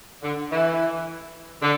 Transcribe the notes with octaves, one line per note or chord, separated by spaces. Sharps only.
D3
E3
D3